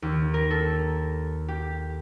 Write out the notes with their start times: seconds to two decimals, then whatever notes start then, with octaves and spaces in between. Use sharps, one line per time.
0.02 D#2
0.34 A#4
0.50 A4
1.48 G4